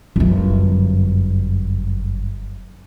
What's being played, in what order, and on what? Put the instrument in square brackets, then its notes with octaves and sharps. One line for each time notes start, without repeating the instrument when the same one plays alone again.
[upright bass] G1 F#2